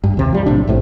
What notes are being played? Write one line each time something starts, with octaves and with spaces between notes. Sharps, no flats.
G2
D#2 C3
F3 G3
B1 A2 C3 D4
A#1 A2 C3